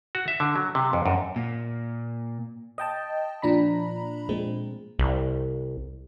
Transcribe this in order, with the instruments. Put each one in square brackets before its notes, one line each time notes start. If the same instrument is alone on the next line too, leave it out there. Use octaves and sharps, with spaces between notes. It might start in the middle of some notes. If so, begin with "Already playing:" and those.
[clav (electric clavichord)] F#4
E5
D3
F#3
C3
F2
F#2
[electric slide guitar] A#2
[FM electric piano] D#5 G5 A5
A#2 F3 D4 A#5 B5
A#2 G#3 C4
[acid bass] C2